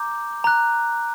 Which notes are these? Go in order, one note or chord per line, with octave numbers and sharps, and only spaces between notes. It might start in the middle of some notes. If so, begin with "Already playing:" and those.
Already playing: A#5 D6 G6
A#5 F#6